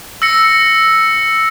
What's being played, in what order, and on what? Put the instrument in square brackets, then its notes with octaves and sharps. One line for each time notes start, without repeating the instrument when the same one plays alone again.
[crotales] E6 A#6 C#7